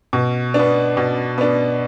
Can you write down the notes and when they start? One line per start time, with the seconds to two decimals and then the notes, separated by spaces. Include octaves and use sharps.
0.13 B2
0.54 B3 D4
0.97 B2
1.38 B3 D4